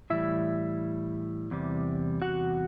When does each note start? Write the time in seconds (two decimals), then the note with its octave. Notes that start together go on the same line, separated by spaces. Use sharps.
0.10 A2 E3 G3 E4 E5
1.51 E2 C3 G3
2.22 F#4 F#5